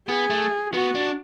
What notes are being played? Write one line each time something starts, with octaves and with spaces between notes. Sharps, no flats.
B3 G#4
A3
B3 F#4
D4